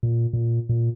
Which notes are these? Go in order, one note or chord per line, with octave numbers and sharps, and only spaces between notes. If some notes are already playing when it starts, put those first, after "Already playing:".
A#2
A#2
A#2